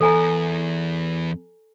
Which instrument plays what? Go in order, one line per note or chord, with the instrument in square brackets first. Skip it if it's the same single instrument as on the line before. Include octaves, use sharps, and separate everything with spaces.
[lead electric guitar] E2 [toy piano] A4 G#5 A#5